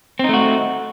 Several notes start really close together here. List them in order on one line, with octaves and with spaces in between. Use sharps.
C4 D#4 A3 F#4